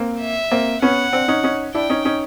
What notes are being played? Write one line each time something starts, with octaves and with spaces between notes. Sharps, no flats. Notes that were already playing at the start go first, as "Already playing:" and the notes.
Already playing: A#3 C4
E5
A#3 C4
B3 C#4 F#5
C4 D4
C#4 D#4
C#4 D#4
D4 E4 G5
C#4 D#4
C#4 D#4